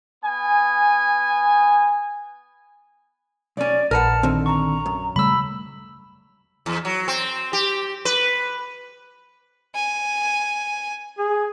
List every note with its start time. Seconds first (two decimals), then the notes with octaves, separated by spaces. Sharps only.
0.24 B3 G#5
3.57 B1 C#4 D5
3.91 A#1 A#4 B4 F#5 A5 F6 C#7
4.23 D3 D#3 C4
4.46 A#5 C#6
4.86 F#2
5.16 C#3 G3 A3 B5 E6
6.66 E2
6.85 F#3
7.08 C4
7.53 G4
8.05 B4
9.75 G#5
11.19 G#4